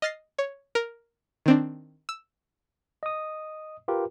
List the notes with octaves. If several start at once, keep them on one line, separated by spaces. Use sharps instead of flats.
D#5 F6 A6 A#6 C7
C#5
A#4
D#3 C4 D4
E6
D#5 D#6
F4 G4 A#4 B4